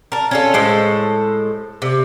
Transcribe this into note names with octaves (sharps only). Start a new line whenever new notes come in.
A#4 A5
C#4 F4 A4
A2 G#3 A4 C5
C3